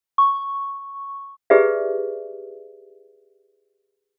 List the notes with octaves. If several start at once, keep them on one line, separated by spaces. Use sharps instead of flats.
C#6
E4 G4 G#4 B4 D5 E5